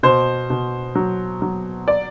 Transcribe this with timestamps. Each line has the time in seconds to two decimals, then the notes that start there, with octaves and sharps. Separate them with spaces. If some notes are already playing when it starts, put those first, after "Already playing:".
0.03 B2 C5
0.50 B2
0.95 F#3
1.42 F#3
1.88 D5